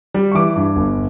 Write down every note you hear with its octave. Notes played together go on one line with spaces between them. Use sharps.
G3
C#6
E3 D6
G2
G1